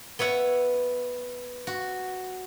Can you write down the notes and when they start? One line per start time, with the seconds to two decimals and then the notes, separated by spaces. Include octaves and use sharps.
0.19 B3 C#5 E5 F#5
1.67 F#4